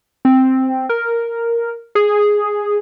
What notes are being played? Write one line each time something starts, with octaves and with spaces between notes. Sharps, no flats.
C4
A#4
G#4